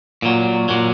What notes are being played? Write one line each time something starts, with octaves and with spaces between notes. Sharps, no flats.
A#2 F#3
A#2 F#3